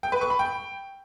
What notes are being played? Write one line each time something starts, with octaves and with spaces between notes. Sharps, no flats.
G5
B4
C#6
B5
G5